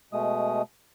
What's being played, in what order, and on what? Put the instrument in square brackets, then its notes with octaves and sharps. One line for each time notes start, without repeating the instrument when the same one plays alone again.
[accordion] B2 G#3 A3 D#6